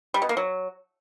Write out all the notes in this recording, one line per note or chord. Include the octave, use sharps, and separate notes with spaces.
G3
B2
A#3
F#3